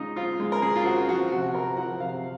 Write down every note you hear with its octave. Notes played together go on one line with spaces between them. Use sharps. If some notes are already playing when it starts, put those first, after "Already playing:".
Already playing: C#3 G#3 D#4 F4
C4 F4
G#3
A#4
C#3 G#4
F4
C4 F#4
F3 F#4
C3 F#4
C4 A#4
F3 F#5
C3 F5